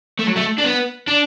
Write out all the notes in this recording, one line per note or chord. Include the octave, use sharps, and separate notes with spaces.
A3
F#3
A3
D4
B3
D4